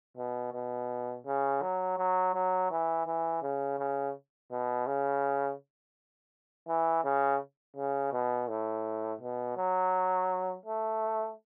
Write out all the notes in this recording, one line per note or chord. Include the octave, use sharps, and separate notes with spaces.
B2
B2
C#3
F#3
F#3
F#3
E3
E3
C#3
C#3
B2
C#3
E3
C#3
C#3
B2
A2
B2
F#3
A3